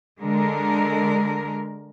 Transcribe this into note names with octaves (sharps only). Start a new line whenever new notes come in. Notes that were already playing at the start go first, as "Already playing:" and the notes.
D3 G#3 A#4